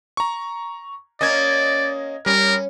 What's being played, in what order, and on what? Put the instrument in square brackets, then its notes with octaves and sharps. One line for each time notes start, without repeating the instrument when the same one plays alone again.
[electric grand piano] A#5 C#6
[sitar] A#3 C#4 [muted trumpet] D5 [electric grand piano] D#5 G#6
[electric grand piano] G3 [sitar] C#4 [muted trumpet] A#4